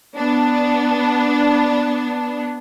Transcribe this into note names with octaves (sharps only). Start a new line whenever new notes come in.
B3 D4